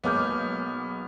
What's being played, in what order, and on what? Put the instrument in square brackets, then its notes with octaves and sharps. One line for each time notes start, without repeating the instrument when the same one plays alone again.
[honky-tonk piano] B1 F6 [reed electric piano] G#3 A#3 [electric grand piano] B3 [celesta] C#5 D6 G6